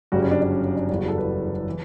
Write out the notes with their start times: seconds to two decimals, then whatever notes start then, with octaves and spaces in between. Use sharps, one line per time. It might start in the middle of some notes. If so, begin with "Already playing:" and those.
0.12 G1 F#2 C#3 G3 F#4
0.22 C#4
0.31 D4
0.42 D4
0.51 C#4
0.77 D4
0.89 F#1 E2 C#3 G3 D4
0.99 F#4
1.08 A4
1.18 B4
1.69 E3